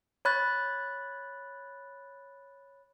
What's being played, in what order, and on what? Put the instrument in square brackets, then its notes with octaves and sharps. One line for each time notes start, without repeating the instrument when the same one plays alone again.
[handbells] C#5 B5 F#6 A6